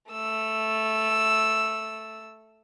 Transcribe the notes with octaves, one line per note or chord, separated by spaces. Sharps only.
A3 E6